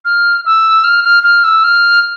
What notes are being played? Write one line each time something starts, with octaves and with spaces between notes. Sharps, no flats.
F6
E6
F6
F6
F6
E6
F6